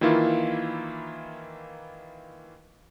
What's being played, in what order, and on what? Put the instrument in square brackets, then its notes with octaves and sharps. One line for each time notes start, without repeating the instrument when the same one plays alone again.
[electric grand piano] D#3 E3 A#3 E4 F4